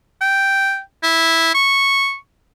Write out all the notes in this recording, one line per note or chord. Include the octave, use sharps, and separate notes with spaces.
G5
E4
C#6